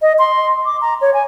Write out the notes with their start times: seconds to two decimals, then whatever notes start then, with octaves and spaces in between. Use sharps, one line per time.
0.02 D#5
0.19 C6
0.65 D6
0.81 A#5
1.01 C#5
1.14 G#5